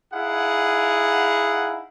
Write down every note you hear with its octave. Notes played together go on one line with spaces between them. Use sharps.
D#4 E4 G#4 F5 F#5